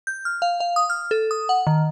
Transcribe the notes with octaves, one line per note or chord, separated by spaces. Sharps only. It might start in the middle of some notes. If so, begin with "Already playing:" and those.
G6
F6
F5
F5
D#6
F6
A4
D#6
F#5
D#3